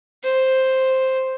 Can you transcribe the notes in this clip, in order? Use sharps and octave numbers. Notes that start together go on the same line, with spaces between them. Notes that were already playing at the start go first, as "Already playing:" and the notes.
C5